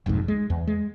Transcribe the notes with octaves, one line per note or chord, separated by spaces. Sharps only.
F1 B1 F2 G#2
G#3
E2
G#3